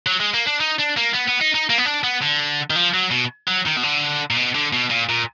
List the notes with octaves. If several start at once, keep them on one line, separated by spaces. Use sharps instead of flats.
F#3
G#3
A#3
D4
D#4
D4
A#3
B3
B3
D#4
D#4
A#3
B3
D4
B3
D3
D#3
F3
F#3
B2
F#3
D#3
B2
D3
A#2
B2
D3
B2
A#2
A#2